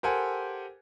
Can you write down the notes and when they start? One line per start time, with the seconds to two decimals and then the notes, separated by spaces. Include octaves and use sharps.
0.03 G4 A4 A#4 C5 F#5 G#5